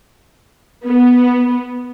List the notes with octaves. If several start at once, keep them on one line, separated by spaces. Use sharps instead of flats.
B3